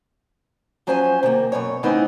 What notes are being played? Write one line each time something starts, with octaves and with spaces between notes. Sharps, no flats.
F3 F#3 C#4 C5 G#5
C3 D#3 A#3
F#2 B2 C#5
A2 C#3 E3 B3 C4 D#4